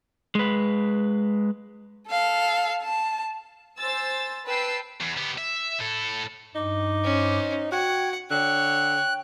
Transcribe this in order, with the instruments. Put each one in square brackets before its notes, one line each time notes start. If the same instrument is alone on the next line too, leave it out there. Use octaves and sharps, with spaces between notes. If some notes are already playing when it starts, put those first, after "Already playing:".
[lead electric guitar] G#3 B4
[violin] A4 F5
A5
[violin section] C5 G#5 E6 A6
B4 G5 A5 E6 C7
[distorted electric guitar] E2
B3 G4
E5
A2 A4
[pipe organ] G2 D6 [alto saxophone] D#4
[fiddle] C#4 C5
[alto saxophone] F#4 [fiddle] F#5 [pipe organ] G5 G#6
[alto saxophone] D3 [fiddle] C#5 [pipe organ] G5 [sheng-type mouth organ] F#6